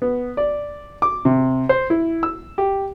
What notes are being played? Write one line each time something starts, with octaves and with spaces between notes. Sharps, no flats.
B3
D5
D6
C3
C5
E4
E6
G4